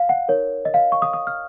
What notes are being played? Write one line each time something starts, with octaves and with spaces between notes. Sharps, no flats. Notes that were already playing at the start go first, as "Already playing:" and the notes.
Already playing: F5
F#5
D#4 A#4 C#5
D#5
F5
C#6
D#6
D#6
F6